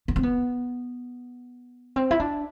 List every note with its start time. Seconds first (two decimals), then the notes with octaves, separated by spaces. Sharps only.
0.08 B3
0.16 C4
0.23 B3
1.96 C4
2.11 E4
2.20 D4